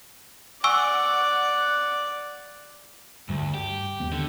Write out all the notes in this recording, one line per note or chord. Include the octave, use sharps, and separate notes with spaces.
D5 F#5 G#5 C#6 E6
D2 G2 G3
G4
D#2 G#3 B3
D3